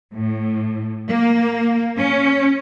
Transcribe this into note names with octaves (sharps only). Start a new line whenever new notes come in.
A2
A#3
C#4